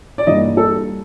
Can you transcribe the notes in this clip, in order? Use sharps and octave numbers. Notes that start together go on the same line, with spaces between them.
D5
G2 E3 G3 A#3 D#5
A4